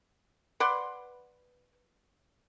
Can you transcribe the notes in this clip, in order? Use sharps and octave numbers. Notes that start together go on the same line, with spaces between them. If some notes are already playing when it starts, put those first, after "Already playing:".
B4 D5 F#5 C6